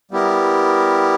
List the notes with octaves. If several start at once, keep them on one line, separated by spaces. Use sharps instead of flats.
G3 B3 E4 G4 A#4